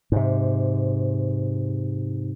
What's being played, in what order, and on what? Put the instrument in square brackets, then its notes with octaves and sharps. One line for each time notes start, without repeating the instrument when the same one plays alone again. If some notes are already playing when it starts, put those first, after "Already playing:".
[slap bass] G#2 C3